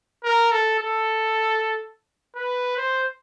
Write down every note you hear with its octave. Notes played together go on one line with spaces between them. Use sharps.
A#4
A4
A4
B4
C5